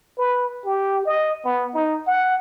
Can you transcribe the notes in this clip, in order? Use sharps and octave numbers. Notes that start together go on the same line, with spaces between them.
B4
G4
D#5
B3
D#4
F#5